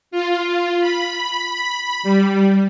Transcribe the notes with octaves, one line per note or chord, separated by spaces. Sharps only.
F4
B5
G3